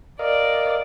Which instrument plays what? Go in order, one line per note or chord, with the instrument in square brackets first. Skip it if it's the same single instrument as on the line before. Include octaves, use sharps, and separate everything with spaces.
[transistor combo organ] A#4 D#5 F5 [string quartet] D5